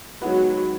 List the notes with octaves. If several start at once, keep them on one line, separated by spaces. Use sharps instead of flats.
D#3 F#3 G#3 B3 F#4 B4